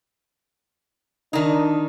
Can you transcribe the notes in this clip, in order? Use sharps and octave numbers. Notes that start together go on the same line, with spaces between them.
D#3 D4 D#4